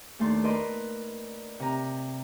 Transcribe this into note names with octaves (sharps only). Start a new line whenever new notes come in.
D#2 A3 D4 A5 C6
A#4 B4 D5 D#5 B5 C6
C3 A#5